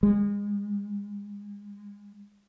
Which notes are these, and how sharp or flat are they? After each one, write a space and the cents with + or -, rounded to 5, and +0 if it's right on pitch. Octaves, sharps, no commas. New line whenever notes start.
G#3 -30